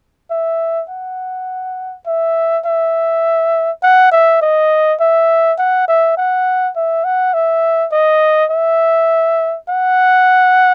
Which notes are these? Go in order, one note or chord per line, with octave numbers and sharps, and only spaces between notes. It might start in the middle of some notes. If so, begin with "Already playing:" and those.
E5
F#5
E5
E5
F#5
E5
D#5
E5
F#5
E5
F#5
E5
F#5
E5
D#5
E5
F#5